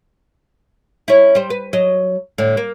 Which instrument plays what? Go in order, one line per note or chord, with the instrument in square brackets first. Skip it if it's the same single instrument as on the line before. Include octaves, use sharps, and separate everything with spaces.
[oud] C#4 E4
G3 C5
B4
F#3 D#5
A2 D3
A#3